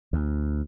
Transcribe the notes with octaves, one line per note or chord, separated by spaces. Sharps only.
D2